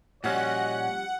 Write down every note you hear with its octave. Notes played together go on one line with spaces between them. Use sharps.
A#2 F3 G3 C#4 F#4 C#5 D#5 F#5